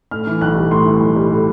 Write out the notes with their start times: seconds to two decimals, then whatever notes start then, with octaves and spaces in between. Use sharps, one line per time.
0.11 A2 F6
0.27 E3
0.41 B1 F#6
0.56 G3
0.71 A2 C6
0.85 E3
1.01 B1
1.16 G3
1.30 A2